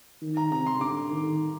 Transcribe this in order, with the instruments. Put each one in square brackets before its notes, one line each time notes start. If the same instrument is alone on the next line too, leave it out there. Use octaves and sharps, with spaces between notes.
[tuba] D#3
[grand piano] A#5
[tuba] C3 [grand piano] A#5
[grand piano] C6
[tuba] D3 [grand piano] D6
[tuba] D#3